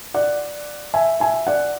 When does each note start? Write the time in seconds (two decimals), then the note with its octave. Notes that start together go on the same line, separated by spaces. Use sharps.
0.14 D5 F#5
0.94 E5 G#5
1.20 E5 G#5
1.47 D5 F#5